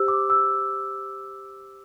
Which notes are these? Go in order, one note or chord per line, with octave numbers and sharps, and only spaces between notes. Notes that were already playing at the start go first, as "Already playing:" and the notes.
Already playing: G4 C5 E6
D6
E6